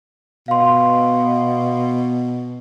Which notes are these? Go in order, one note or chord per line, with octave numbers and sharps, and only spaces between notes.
B2 F5 C6